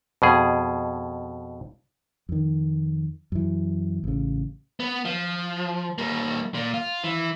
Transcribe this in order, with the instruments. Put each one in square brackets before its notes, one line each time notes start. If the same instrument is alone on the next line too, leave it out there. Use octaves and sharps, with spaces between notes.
[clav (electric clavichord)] F2 B2 G#4
[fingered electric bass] F2 D#3
F#2 E3
A1 C#3
[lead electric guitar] B3
F3
G3 A#3
A#2
F4
E3